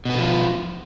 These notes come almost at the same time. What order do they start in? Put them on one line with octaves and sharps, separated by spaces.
B2 B3 D3 F3